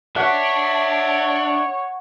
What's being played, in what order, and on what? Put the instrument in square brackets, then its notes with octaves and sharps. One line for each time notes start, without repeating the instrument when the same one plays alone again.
[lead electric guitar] D4 [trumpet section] C#5 [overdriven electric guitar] E5 [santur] F#5